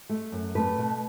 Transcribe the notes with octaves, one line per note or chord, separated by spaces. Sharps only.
A3
F#2
A3 B4
B2